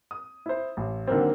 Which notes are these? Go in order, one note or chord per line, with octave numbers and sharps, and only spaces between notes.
D#6
E4 C5
A1
D3 D#3 F#3 A#3 C4